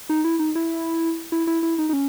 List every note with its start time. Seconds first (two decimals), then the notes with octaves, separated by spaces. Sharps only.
0.09 D#4
0.24 E4
0.39 D#4
0.55 E4
1.32 E4
1.47 E4
1.63 E4
1.78 D#4
1.89 D#4
1.93 C#4